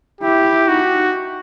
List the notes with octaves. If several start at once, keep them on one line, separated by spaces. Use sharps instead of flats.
E4 G4
D#4 F#4